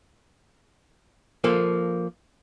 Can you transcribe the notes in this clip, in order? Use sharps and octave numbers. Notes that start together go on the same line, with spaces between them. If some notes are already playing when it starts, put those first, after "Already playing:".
F3 A#3 A4